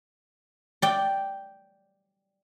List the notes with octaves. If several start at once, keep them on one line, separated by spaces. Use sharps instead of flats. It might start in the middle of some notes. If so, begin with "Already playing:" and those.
D5 G5